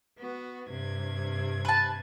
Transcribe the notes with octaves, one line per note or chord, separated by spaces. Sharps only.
B3 F#4
G2 C3 G#6
B4 A5